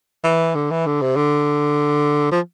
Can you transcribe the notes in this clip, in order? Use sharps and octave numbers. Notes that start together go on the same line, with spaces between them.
E3
D3
E3
D3
C3
D3
F3